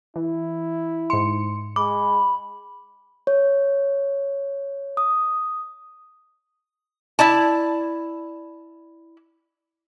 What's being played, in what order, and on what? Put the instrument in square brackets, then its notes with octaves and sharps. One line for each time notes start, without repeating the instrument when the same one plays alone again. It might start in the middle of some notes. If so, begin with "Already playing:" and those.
[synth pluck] E3 [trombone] E4
[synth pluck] G#2 C#7 [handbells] C6
[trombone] G#3 [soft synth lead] B5 [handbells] D6
[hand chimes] C#5
D#6
[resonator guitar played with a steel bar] E4 D5 A5